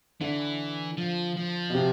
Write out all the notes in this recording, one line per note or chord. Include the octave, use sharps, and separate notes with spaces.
D3 E3
F3
F3
B2
C3